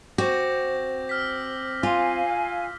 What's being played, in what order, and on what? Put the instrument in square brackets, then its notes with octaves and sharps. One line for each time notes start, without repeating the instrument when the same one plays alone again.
[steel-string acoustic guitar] C4 [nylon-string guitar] F#4 [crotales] D6 G6 A#6
[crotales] E6 F6 B6
[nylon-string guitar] F4 [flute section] F5 G#5